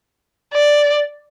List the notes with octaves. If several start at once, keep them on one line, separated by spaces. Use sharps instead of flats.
D5